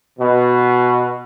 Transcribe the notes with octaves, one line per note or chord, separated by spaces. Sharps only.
B2